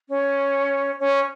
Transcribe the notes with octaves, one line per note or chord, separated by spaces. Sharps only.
C#4
C#4